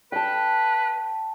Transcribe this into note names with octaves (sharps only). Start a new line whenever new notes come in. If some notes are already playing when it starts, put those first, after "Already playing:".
B4 G5 A5